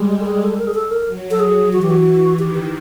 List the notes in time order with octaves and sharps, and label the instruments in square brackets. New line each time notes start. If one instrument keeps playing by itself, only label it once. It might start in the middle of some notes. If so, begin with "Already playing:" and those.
Already playing: [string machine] G3 G#3
[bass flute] G4
A4
G#4
A4
A#4
G#4
A4
A#4
[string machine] F#3
[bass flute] A4
G#4
[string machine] E3 [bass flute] F#4
[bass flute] G4
F#4
[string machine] E3
[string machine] D#3 [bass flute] G4
[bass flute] G4